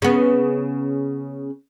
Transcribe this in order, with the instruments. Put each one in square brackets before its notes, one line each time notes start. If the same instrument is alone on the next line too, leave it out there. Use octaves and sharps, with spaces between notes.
[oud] C#3 B3